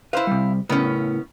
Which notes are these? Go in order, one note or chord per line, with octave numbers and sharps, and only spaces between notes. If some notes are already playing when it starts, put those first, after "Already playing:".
E4 B4 C5 F5
C3 G3
A2 C#3 B3 C#4 A#4